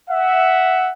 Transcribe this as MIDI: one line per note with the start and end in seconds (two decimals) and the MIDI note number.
0.10 0.92 76
0.10 0.92 78